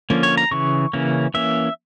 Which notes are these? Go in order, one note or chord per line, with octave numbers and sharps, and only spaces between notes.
D3 F3 A#3 C#4
C#5
A#5
C#3 E3 C#6
C#3 E3 A#3 C#4
E3 A#3 C#4 E5